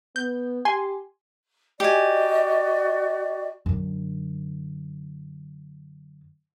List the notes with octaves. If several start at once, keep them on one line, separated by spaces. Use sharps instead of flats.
B3 G6
G4 G#5 C6
F#4 G4 D5 D#5 G#5
F#2 D3